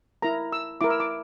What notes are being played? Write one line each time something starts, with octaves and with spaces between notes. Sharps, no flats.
E4 A#4 A#5
E6
E4 A#4 D6
E6
D6